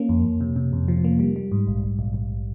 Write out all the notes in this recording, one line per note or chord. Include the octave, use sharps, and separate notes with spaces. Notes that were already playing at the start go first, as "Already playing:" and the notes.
Already playing: A#3 C#4
F2
F2
C3
C3
F2
F3
A#3
G3
G3
G#2
A#1
A#1
A#1
A#1